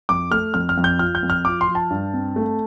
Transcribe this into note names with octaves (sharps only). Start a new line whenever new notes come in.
F2 D6
A3 F6
F2 F6
F6
F2
G6
F3 F6
G6
F2
F6
F3 D6
C6
F3
A5
G2
C4
A3